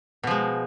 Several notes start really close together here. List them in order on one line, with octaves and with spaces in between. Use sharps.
B2 F3 G#3